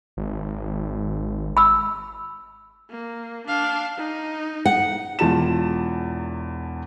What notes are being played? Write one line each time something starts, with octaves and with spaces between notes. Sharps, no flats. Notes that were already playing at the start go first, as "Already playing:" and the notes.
G#1
B5 E6
A#3
D4 F5
D#4
F#5
E1 E2 F4 A5 E7